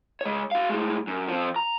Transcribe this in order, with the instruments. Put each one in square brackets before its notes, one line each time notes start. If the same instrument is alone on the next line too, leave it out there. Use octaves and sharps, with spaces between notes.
[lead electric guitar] G#3 C#5
F#4 F5
A2 G#3
F#2
F3 C4
A#5